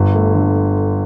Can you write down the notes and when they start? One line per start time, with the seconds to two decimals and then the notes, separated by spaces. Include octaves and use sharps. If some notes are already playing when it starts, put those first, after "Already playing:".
Already playing: G1
0.14 A3
0.34 D3